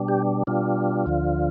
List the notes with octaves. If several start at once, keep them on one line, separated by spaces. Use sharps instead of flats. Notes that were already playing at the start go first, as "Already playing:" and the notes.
Already playing: B2 G3 D4
G4
B2 G3 D4 F4
D2 D3 F3